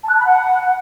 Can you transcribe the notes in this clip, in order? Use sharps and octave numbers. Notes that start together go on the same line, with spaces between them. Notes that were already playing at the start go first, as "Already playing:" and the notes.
A5
F#6
A5
B5
F#5